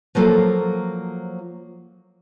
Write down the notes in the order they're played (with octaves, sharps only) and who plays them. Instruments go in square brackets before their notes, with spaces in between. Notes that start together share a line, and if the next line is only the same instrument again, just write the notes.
[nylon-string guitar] F3 F#3 A#3 F4 A4